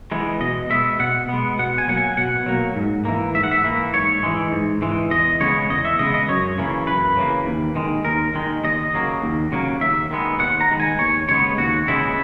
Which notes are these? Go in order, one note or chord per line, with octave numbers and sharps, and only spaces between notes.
E3 G#3 B3
B2 D#5
G#3 B3 E5
B2 F#5
G#3 B3
B2 F#5
G#5
F#3 A#3 F#5
G#5
B2 F#5
F#3 A#3
G#2
E3 A#3
G#2 E5
F#5
E5
E3 A#3
G#2 C#5
E3 G#3
G#2
E3 G#3
E2 D#5
C#3 G#3 B3 C#5
E2 D#5
E5
C#3 G#3 B3 D#5
D#5
F#2 C#5
C#3 E3 A#3
F#2 B4
C#3 E3 A#3
D#2
D#3 G#3
D#2 A#4
D#3 G#3
D#2 D#5
C#3 F#3 A#3
D#2
C#3 F#3 A#3
D#2 E5
D#3 G#3 B3
D#2 F#5
A#5
D#3 G#3 B3
G#5
D#2 C#5
C#3 G#3 B3 C#5
D#2 F#4
C#3 G#3 B3 E4